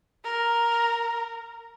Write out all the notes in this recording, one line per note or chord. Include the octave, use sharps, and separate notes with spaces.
A#4